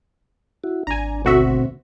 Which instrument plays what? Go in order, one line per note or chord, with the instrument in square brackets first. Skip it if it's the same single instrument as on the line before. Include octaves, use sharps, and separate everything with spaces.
[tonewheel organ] E4 F#4
[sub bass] G#1 [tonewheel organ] D4 [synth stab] G#5 A#5
[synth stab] D2 F#4 E5 [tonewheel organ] B2 C4